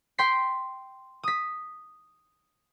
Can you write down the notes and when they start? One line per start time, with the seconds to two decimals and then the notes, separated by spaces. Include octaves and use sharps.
0.18 G5 C6 B6 C7
1.23 D#6 B6